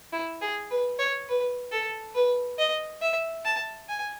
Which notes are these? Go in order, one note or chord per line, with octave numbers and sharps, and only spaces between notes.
E4
G#4
B4
C#5
B4
A4
B4
D#5
E5
A5
G#5